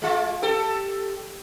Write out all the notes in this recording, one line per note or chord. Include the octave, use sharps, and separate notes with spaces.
G#3 F4
G4 A4